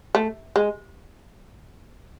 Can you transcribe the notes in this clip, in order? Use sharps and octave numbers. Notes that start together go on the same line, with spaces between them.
A3
G#3